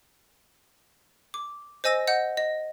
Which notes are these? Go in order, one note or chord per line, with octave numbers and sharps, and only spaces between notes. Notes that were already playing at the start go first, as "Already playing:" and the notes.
D6
C5 D#5 G#5 E6 A#6
D#5 F#5 G6
D#5